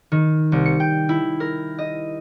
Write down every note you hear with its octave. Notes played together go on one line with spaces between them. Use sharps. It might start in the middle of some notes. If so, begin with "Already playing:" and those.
D#3
C2
C#7
G5
E4
A#4
D#5